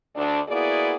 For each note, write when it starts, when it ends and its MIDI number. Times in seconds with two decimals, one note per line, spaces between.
0.16 0.41 38
0.16 0.41 62
0.49 0.96 58
0.49 0.96 59
0.49 0.96 64
0.49 0.96 66
0.49 0.96 68
0.49 0.96 74